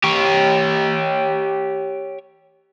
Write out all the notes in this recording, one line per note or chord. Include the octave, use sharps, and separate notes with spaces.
G4 C#5